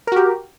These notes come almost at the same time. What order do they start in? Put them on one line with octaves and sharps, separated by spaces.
A#4 F#4 G4